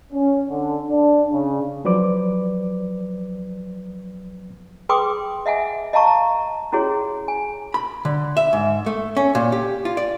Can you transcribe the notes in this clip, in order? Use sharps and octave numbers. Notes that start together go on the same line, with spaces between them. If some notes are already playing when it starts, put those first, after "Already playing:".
C#4
D3
D4
C#3
F3 F#3 B4 C5 D5 D6
G#4 B4 G5 C6 D6 D#6
D#5 E5 F#5 G#5
D#5 F5 A5 A#5 C#6
A#5
C#4 E4 F#4 G#4 C#5
G#5
B5
D3
E5
G#2
A3
C#4
A#2
G4
F4
D5